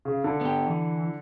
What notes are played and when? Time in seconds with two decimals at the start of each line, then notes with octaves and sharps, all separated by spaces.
0.05 C#3
0.24 D3
0.41 B3 G4
0.67 E3